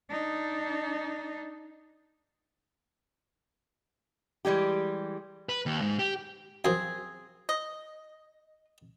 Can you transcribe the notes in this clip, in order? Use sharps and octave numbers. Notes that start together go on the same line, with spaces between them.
D4 D#4
E3 G3 G#3 G4
B4
D#2
G#2
G4
F#2 F3 C4 G#4
D#5